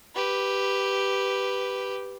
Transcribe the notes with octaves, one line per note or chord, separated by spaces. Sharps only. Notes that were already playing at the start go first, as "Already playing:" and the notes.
G4 B4